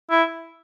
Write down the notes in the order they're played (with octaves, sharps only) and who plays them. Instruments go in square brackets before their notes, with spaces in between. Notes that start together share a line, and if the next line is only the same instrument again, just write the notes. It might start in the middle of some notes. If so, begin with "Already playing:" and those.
[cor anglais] E4